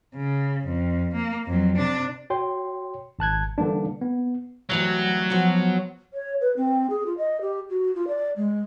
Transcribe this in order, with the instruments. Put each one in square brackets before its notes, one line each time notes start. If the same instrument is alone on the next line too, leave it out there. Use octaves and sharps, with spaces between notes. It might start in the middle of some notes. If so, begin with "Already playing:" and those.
[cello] C#3
F2
A#3
F2 F#3
C3 D4
[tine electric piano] F#4 C#5 G5 C6
G#1 A5 F#6 G#6
D3 E3 G3 A#3 D4
B3
[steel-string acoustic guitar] D2 E3 G3 [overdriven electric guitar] F#3
[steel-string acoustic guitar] F3 B3 F#4
[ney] C#5
B4
C4
G#4
F4
D#5
G4
F#4
F4
D5
G#3